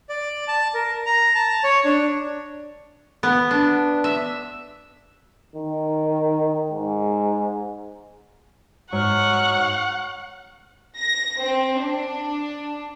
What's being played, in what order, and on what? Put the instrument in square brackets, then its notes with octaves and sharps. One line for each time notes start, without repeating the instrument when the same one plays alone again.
[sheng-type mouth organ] D5
A5
A#4
A#5
A5
C#5
D4
[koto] B3
D4
E5
[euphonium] D#3
G#2
[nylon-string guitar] G#2 [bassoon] F#3 [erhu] F#5 [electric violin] C#6 F6
[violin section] A#6
C4
D4